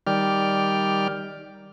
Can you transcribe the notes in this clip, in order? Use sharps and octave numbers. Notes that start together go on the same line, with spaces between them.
D#3 G3 D5 G5 F6